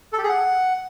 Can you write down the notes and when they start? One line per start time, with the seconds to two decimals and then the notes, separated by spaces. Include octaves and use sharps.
0.13 A4
0.18 G4
0.23 G#4
0.29 F#5